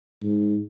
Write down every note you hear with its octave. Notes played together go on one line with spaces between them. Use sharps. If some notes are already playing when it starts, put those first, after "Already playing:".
G#2